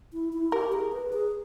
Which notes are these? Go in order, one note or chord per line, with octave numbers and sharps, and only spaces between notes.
E4
E4
G4 A#4
G#4
B4
G#4